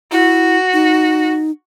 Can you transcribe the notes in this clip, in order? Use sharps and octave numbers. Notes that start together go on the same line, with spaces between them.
E4 F#4
D#4